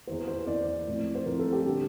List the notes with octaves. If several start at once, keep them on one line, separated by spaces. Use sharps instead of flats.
E2 E3 A#3 C5
C5
E2 E3 A#3 D5
A2 F3 A3 C4
C5
A2 F3 A3 C4 A#4
A4
G4
D3 G3 A#3